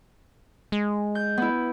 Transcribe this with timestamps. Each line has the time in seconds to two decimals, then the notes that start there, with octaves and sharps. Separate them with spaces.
0.72 G#3
1.15 G6
1.37 B3 E4